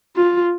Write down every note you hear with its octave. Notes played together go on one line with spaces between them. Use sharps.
F4